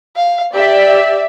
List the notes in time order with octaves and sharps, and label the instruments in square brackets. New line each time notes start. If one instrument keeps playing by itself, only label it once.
[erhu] F5
[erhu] G4 [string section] D5 E5